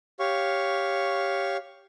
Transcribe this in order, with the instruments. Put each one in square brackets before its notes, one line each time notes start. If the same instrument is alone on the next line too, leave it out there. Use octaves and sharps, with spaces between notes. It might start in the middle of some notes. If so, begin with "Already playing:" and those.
[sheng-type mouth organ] G4 C#5 F5 C#6